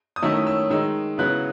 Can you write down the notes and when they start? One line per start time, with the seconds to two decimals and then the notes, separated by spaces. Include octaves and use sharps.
0.16 D#6
0.22 D#3 F#3 A3 C#4 E4 E6
0.47 E6
0.70 D#3 G#3 D#4 E6
1.18 C#3 F#3 B3 E4 F#6